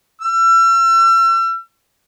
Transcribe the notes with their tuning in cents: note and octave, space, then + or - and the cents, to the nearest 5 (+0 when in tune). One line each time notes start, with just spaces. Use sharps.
E6 +40